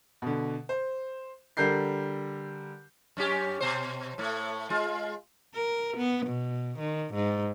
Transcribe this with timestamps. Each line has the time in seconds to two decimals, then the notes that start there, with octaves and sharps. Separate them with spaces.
0.22 B2 D3
0.69 C5
1.57 D3 G3 A#4 G6 C7
3.17 F#2 C#4 G4
3.60 B2 C5
4.18 A2 A3
4.70 G#3 F4
5.55 A#4
5.97 B3
6.26 B2
6.79 D#3
7.14 G#2